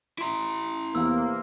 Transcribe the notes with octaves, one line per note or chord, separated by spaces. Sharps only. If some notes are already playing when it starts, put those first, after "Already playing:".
E4 A#5 C6 D7
E2 C3 E3 A#3 E6